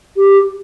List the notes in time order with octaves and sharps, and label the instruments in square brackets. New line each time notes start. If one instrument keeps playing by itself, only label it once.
[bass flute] G4